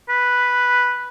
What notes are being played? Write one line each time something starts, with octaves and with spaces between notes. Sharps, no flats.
B4